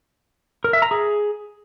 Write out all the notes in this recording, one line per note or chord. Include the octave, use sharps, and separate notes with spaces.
A#4
E5
A#5
G#4